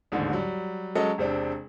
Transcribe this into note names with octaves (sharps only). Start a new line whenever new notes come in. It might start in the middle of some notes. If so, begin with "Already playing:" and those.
A1 D#2 G#2 D3
F#3 G3
F#3 G#3 C#4 A4 D#5
E1 C3 C4 D4